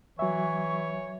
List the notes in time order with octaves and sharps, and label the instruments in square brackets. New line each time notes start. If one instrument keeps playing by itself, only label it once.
[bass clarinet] E3 [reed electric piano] F#3 E5 [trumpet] C#5 [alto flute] C#6